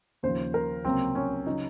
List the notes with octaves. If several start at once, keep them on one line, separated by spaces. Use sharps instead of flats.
D#2 C#3 F3 C5
A#4
C#2 C3 F#3 A#3 C4
C#4
C#3 F#3 D#4